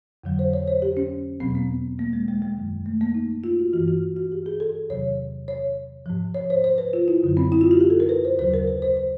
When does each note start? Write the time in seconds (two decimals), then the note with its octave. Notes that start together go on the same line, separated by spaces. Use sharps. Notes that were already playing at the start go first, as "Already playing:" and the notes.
0.24 F2 D3 F#3
0.39 C5
0.53 C#5
0.67 C5
0.82 G4
0.97 C#4
1.40 E2 B2 F#3 C4
1.55 B3
1.99 A#3
2.13 G#3
2.28 G#3
2.42 G#3
2.56 F#2 D#3 F#3
2.86 A3
3.01 A#3
3.14 D#4
3.44 F4
3.59 F#4
3.73 E3 F#4
3.77 G2
3.88 F#4
4.16 F#4
4.32 G4
4.46 G#4
4.60 A4
4.89 E2 C3 D#3 F#3 C#5
5.48 C#5
6.06 G#2 F3
6.35 C#5
6.50 C5
6.64 C5
6.78 B4
6.93 F4
7.08 E4
7.23 F#2 D3 F#3
7.37 C4
7.52 E4
7.61 F4
7.71 F#4
7.81 G4
7.90 A4
8.00 A#4
8.09 B4
8.25 C5
8.39 D#2 C#3 F#3 C5
8.54 A#4
8.67 B4
8.82 C5
8.97 C5